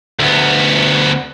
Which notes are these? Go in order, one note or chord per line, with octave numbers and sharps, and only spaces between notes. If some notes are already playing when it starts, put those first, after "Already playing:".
D2 B3